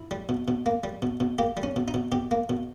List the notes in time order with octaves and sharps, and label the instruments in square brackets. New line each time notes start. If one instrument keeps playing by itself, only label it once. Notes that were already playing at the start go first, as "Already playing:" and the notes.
Already playing: [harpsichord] E4
G3
B2
B2
A#3
G3
B2
B2
A#3 G4
G3
C#4
B2
D#4
B2
B2 G4
A#3
B2